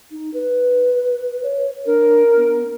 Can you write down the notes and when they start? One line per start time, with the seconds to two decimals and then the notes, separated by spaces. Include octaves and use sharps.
0.11 D#4
0.34 B4
1.43 C#5
1.86 D4 A#4
2.37 B3